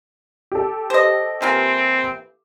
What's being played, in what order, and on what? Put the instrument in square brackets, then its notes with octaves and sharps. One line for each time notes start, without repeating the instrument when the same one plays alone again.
[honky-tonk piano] G4 A4
[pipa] C5 D#5
[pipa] E3 A#3 F4 [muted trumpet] C4